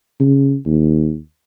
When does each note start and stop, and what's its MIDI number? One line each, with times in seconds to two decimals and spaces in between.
0.20 0.56 49
0.66 1.18 39